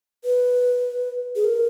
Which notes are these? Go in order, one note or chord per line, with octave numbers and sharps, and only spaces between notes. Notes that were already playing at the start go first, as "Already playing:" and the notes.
B4
G#4
A#4